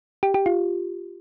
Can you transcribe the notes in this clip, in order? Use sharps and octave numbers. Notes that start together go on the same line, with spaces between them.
G4
G4
F4